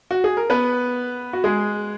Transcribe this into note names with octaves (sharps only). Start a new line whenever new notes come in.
F#4
G#4
A#4
B3 B4
F#4
G#3 G#4